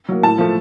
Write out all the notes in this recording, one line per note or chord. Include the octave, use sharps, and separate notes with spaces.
F#3 A#3
A2 A5
F3 A3